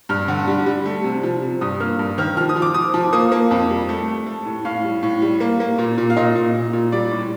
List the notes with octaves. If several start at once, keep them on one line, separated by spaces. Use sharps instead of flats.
G2 F6
D3
G3
G3
A3
C3
F3
C3
G2 D#6
A#3 F6
G2
D#3 F6
F3 F6
D#6
F3
D6
F3 D#6
F3
A#3 D#6
A#3
F2
G3
A3
A3
A3
A2
A2 F5
G3
A2
G3
A#3
A#3
A#2
A#2
F5
A#2 D#5
A#2
A#2
A#2
G3 D5
A2